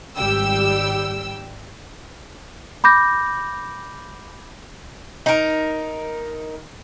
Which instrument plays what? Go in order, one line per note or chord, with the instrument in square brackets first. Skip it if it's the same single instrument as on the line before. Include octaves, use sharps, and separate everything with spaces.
[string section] G#1 G3 G5 E6
[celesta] B5 D6 G6 A#6
[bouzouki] D#4 A#4